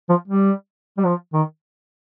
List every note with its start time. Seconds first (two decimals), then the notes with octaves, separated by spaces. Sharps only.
0.09 F3
0.28 G3
0.98 G3
1.05 F3
1.33 D#3